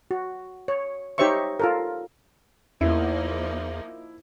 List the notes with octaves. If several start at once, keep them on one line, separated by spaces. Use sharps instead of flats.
F#4
C#5
D#4 G4 C5 C#5 E5 C#6
F4 A4 A#4
E2 F3 A#3 D#4 E4